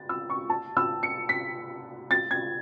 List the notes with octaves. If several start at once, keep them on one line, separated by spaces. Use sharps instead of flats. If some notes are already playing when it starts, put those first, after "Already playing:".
Already playing: A6
E6
C#6
A5
E6
C#7
B6
A6
G#6